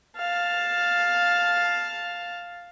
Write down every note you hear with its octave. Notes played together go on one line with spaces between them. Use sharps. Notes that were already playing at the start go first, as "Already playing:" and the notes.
F5 A5